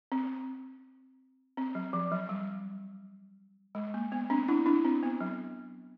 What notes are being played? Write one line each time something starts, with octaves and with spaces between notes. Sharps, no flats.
C4
C4
F#3
F3
F#3
G3
G#3
A#3
B3
C4 D4
D4 E4
D4 E4
C4
B3
F#3